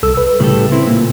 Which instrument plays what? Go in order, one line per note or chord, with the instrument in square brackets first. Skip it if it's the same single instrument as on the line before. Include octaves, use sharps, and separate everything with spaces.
[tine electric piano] C2 A4 E6
B4
[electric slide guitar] A2 G3 A4 [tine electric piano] C#3
[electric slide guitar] C4 E4
[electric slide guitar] A#2 [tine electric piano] A#3